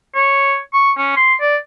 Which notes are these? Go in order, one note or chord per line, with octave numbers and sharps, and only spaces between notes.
C#5
C#6
C#4
C6
D5